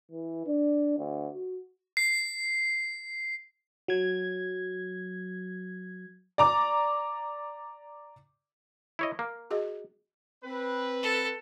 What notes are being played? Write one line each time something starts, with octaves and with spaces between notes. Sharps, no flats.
E3
D4
D2
F#4
C7
F#3 G#6
D5 A#5 D6
E4 C#5 D#5
A#3
F#4 G#4 D#5
C4 B4
A4